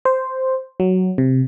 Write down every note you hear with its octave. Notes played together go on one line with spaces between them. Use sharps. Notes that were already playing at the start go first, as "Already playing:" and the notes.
C5
F#3
C3